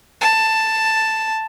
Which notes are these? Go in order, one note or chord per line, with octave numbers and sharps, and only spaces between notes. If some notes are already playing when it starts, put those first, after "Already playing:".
A5